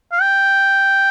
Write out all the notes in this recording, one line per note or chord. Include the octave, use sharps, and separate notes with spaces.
F5
G5